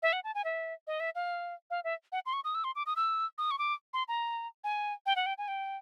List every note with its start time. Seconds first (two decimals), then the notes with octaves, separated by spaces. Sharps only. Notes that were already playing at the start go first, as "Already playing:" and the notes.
0.02 E5
0.13 F#5
0.24 A5
0.35 G#5
0.44 E5
0.87 D#5
1.00 E5
1.15 F5
1.70 F5
1.84 E5
2.12 F#5
2.26 C6
2.33 C#6
2.44 D#6
2.55 E6
2.64 C6
2.76 D6
2.86 D#6
2.96 E6
3.38 D#6
3.51 C#6
3.59 D6
3.93 C6
4.08 A#5
4.64 G#5
5.06 G5
5.16 F#5
5.26 G5
5.38 G#5
5.48 G5